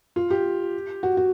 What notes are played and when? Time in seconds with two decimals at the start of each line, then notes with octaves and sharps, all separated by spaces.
0.16 F4
0.30 G4
1.03 F#4
1.17 F#4